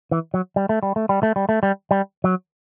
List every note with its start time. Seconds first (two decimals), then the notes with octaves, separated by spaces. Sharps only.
0.11 E3
0.34 F#3
0.56 G3
0.69 A3
0.83 G3
0.96 A3
1.09 G3
1.23 A3
1.36 G3
1.49 A3
1.63 G3
1.91 G3
2.24 F#3